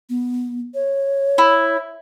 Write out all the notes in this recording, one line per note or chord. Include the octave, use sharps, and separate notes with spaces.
B3
C#5
E4